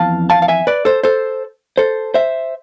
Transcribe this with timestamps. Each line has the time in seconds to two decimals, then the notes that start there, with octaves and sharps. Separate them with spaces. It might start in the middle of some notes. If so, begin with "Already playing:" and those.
Already playing: F2 E3 B3 F5 A5
0.30 F5 A5
0.42 F5
0.48 E5 G#5
0.67 B4 D5
0.85 A4 C5
1.03 A4 C5
1.78 A4 C5
2.14 C5 E5